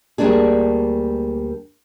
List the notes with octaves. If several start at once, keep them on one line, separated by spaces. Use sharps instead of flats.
D2 G3 A#3 D4 G#4